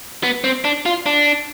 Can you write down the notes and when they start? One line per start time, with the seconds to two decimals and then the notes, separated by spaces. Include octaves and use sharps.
0.23 B3
0.44 C4
0.64 D4
0.86 F4
1.06 D4